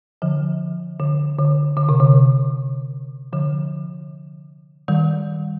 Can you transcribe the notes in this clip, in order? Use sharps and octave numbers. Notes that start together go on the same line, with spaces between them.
D3 F3
D3
D3
D3
C3
D3
D3 F3
D#3 G3